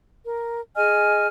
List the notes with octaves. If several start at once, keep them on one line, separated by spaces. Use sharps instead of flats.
A#4
G#4 D#5 G#5 F6